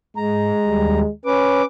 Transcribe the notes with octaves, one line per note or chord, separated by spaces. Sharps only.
G#2 G#3 A#5
D#2 G3
C#4 B4 D6